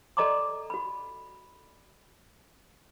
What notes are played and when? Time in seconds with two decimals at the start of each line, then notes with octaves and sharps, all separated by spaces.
0.17 A4 D5 D#5 A#5 C6 D6
0.70 F#4 B5